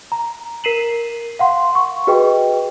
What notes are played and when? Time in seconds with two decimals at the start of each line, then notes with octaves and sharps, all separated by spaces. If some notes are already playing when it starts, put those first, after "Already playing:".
0.12 A#5
0.64 A#4 B6 C7 D#7 E7 F#7
1.39 F5 F#5 C6
1.75 C#6
2.07 F#4 G#4 B4 D#5 G5